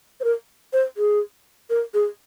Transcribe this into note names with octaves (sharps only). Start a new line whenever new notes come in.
C5
A#4
C5
G#4
A#4
G#4